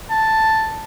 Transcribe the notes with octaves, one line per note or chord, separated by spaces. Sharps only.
A5